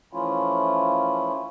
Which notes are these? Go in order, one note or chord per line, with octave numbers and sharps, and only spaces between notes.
E3 F3 A3 C#4 E4 F4